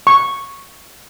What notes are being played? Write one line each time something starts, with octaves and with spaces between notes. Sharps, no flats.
C#6